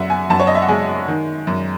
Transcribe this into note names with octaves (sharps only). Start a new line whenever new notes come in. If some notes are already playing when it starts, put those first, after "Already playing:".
Already playing: F#2 E5 F#5
G#5
F#2 A5
C#5
D#5
E5
F#5
G#3 G#5
D#3
F#2